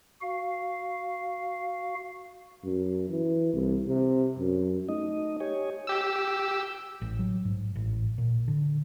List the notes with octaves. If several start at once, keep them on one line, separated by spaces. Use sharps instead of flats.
F#4 F5
F#2
E3
C2
C3
F#2
A3 D#4 D#5
G4 C#5 D#5 G#5
G4 E6
A1
F#3
G#2
A1
A#2
D3